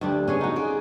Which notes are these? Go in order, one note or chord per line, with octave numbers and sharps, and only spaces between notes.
D2 G2 G3 D4
C#3 B3 C#4 G#4 C#5
D#4 F#4
F4 G#4 D5